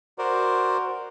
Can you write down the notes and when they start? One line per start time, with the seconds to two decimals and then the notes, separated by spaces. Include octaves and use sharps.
0.18 F#4 A#4 C5 D5